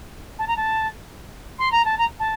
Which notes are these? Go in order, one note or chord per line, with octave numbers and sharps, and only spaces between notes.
A5
A#5
A5
C6
A#5
A5
A#5
A5